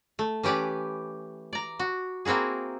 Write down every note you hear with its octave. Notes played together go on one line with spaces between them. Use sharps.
A3
E3 C#4 G4 B4 D5
D5 A#5
F#4
A#3 C4 E4 F#4 G#4